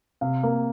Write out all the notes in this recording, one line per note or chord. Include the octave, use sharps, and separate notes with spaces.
C3 F5
A#3